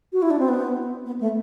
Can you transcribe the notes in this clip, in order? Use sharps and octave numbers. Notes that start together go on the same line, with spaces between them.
F#4
E4
D4
C4
B3
B3
A3